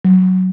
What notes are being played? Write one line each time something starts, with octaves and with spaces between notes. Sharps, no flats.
F#3